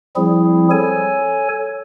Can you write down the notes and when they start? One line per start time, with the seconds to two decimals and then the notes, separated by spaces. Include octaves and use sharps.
0.16 F3 G3 C4 E4 G#4
0.71 A4 C#5 G#5